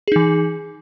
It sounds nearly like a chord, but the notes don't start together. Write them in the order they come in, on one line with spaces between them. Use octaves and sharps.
G#4 D#4 E3